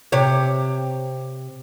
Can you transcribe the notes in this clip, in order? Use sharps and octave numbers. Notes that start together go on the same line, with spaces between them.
C3 G4 C#5